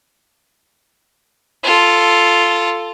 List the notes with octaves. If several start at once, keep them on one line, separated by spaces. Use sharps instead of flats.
F4 A4